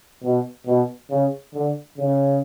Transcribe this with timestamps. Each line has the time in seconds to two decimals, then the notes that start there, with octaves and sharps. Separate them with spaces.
0.23 B2
0.67 B2
1.10 C#3
1.54 D3
1.98 C#3